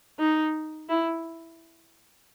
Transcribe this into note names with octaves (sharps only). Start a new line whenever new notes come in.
D#4
E4